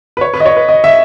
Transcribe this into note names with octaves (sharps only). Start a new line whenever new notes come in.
B4
C#5
B4
D#5
C#5
B4
D#5
E5